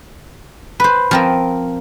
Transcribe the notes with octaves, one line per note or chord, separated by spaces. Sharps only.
B4 C5
F3 C4 A#4